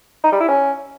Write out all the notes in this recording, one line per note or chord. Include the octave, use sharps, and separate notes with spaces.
D#4
G3
E4
C#4